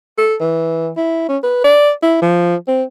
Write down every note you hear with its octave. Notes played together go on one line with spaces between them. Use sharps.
A4
E3
E4
C#4
B4
D5
E4
F3
C4